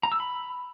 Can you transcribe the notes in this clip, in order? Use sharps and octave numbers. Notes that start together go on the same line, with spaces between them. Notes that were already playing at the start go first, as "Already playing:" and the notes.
A#5
E6
B5